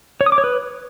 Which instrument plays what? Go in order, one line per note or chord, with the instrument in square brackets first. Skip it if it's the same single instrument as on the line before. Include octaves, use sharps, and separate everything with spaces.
[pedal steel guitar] C#5
D#6
D6
C#5
B4